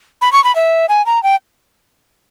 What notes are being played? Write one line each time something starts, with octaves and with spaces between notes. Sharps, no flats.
B5
C#6
B5
E5
G#5
A#5
G5